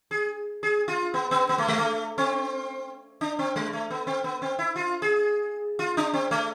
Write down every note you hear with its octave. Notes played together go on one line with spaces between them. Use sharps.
G#4
G#4
F4
B3
B3
B3
A3
G#3
A3
C4
D4
C4
G#3
A3
B3
C4
B3
C4
E4
F4
G#4
F4
D4
C4
A3